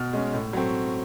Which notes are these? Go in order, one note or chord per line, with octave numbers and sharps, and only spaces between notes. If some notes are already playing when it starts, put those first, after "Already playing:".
Already playing: B2 F6
G#3 C#4
A2
F#3 A3 C4